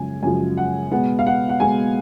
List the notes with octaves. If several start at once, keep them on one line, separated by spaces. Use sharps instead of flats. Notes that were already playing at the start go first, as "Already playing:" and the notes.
Already playing: F#2 C#3 F3 G#3 G#5
F#2 C#3 F3 G#3 G#5
F#5
B2 G#3 B3 F#5
F5
F#5
F#5
B2 G#3 B3 G#5